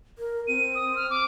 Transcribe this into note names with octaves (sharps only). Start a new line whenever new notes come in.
A#4
C4 D#7
D#6
F6
D6